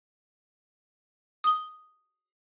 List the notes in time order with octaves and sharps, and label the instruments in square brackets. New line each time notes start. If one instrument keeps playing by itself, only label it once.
[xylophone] D#6 G7